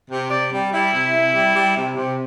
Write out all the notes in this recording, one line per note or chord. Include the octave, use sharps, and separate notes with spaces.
C3
C3 D5
G3
G3 E4
C3
C3
G3
G3
C3
C3